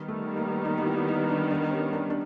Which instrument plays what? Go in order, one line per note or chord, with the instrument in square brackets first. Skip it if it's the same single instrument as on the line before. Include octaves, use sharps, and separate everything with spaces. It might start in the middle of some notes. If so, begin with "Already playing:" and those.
Already playing: [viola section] D#3 G3 B3
[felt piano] A3
A#3
D#4
D#4
E4
E4
D#4
D4
D4
C#4
D4
D4